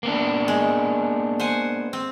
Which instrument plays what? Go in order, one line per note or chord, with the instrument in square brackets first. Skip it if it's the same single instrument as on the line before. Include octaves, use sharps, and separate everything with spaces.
[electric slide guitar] A#3 B3 D4
[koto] G#3
C5 F#5 G#5
C4